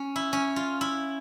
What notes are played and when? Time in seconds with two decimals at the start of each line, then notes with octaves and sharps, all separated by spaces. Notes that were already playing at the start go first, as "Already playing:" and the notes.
Already playing: C#4
0.16 E4
0.33 C#4
0.56 F4
0.81 E4